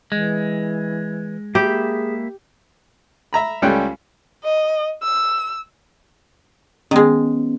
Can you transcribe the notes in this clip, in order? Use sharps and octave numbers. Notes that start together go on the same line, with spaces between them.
E3 G#3
A#3 G4 G#4 E5 B5
E5 A#5 B5
C#2 G3 A3 C#4 G5 F#6
D#5
E6
D#3 G#3 B3 C#4